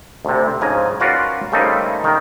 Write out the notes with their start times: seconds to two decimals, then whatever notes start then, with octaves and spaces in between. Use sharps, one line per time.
0.25 D2 C3
0.61 G#2 C#3 F3 G#5 A#5
1.00 C#4 F4 F#4 A#4 B4 D5
1.52 C#3 G3 A3 A#3 C4 D#4
2.04 D#3 A#4